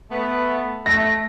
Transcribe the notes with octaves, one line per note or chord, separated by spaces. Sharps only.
A3 B3
A3 A#6